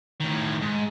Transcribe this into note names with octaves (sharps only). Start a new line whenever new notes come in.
A2 D#3
G#2